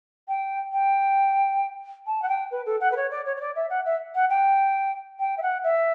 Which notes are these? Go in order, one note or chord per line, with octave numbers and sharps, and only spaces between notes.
G5
G5
A5
F#5
G5
B4
A4
F#5
B4
C#5
D5
C#5
C#5
D5
E5
F#5
E5
F#5
G5
G5
E5
F#5
E5